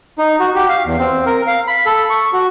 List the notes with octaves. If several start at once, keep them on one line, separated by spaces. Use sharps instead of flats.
D#4
F#4
G4
F5
E2
C4
A#4
F5
B5
A4
C#6
F#4